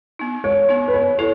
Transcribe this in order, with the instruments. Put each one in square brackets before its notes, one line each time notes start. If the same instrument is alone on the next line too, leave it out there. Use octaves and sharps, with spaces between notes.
[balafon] B3 D#4
[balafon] G#3 [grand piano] C#5
[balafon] B3 D#4
[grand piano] B4
[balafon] B3 [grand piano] C#5
[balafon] E4 A4 [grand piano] C#5